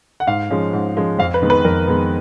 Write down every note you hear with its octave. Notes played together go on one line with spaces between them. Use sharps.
F#5
G#2 F5
F3 G#3 C#4
G#2
F3 G#3 C#4
F2 F5
B4
D#3 G#3 B3
B4
F2 A#4
D#3 G#3 B3